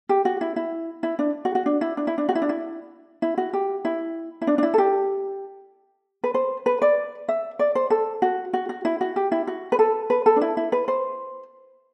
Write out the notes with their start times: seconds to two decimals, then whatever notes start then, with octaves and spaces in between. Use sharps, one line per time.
0.09 G4
0.25 F#4
0.41 E4
0.56 E4
1.03 E4
1.19 D4
1.45 F#4
1.55 F#4
1.66 D4
1.81 E4
1.97 D4
2.07 E4
2.18 D4
2.29 F#4
2.35 E4
2.42 D4
2.49 E4
3.22 E4
3.38 F#4
3.53 G4
3.85 E4
4.42 E4
4.47 D4
4.58 D4
4.63 E4
4.74 A4
4.78 G4
6.24 B4
6.34 C5
6.66 B4
6.82 D5
7.29 E5
7.59 D5
7.75 C5
7.90 A4
8.22 F#4
8.53 F#4
8.69 F#4
8.85 E4
9.01 F#4
9.16 G4
9.32 E4
9.47 F#4
9.72 B4
9.79 A4
10.10 B4
10.26 A4
10.36 D4
10.41 E4
10.57 E4
10.72 B4
10.88 C5